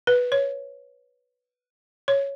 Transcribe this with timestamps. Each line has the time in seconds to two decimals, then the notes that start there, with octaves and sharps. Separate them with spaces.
0.07 B4
0.32 C#5
2.08 C#5